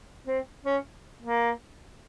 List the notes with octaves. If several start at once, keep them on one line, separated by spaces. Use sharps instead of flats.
C4
C#4
A#3